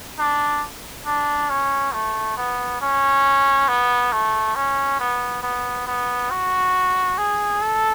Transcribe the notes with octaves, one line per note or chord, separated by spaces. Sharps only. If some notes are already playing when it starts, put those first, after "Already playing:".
D4
D4
C#4
A3
B3
C#4
B3
A3
C#4
B3
B3
B3
F#4
G#4
A4